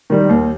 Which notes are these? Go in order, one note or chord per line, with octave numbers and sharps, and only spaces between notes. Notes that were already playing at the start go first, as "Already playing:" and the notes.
D#3 G3
D#2